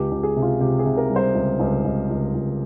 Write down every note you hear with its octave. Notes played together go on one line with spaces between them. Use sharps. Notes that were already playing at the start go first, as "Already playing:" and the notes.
Already playing: C#2 G4
C#2
G#4
C3
F4
C3 G4
G#4
C3
A#4
G3
C5
C#2
C#2
C#2
C#2
C#2